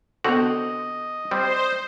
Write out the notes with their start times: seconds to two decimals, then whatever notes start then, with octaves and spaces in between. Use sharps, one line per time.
0.24 D3 B3 C4 F#4 A4 D#5
1.31 G3 C4 C5